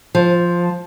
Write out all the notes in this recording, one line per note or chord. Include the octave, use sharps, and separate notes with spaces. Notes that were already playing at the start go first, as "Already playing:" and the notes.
F3